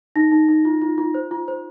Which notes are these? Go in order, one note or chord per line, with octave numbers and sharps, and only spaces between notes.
D#4 A#6
D#4
D#4
F4
F4
F4
C5
F4
C5